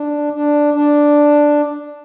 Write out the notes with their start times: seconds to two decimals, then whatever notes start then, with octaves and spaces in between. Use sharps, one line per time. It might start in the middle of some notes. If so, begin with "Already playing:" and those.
Already playing: D4
0.33 D4
0.74 D4